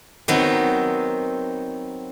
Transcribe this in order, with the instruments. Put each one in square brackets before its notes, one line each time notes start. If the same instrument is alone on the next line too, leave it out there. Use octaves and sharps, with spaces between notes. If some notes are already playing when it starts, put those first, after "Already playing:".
[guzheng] D#3 F#3 B3 C4